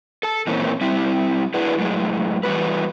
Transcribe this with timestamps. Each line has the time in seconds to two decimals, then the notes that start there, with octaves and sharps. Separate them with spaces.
0.23 A4 A5
0.47 A#2 E3 A#3 C4 C#4
0.81 G3 C4 E4
1.54 D4 E4 F#4 G#4 B4
1.78 F#2 A2 G#3
2.43 E2 G3 F#4 B4